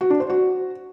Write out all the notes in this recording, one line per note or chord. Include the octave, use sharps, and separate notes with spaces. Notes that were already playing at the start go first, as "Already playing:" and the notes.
F#4
D4
C5
F#4